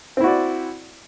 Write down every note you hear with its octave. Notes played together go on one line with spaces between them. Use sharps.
C4 E4 F#4 D5